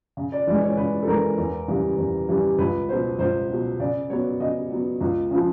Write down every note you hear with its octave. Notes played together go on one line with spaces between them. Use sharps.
C#3
D5
E3 G#3 D5
C#5
C#3 B4
A4
E3 G#3 A#4
E2
C#3 E3 G3
E2
C#3 E3 G3
C#2 B4
B2 F#3 C5
C#2 C5
B2 F#3
C#3 D5
F#3 B3 C#5
C#3 D#5
F#3 B3
C#2
C#3 F3